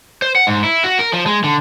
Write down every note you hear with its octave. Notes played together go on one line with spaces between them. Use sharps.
C5
F#5
G#2
E4
F#4
A#4
F3
G#3
D3